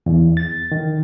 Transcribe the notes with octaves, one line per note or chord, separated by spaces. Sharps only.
E2
A6
D#3